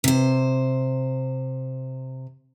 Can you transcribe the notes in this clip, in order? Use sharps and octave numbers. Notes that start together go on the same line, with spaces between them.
C3 C5